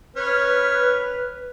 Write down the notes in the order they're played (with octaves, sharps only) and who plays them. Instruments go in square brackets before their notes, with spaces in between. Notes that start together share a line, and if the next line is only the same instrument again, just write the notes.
[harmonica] C#4 F6 [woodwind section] B4